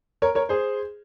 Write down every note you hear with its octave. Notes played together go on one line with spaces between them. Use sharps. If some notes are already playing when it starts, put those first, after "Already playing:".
A#4 C#5
A#4 C#5
G#4 C5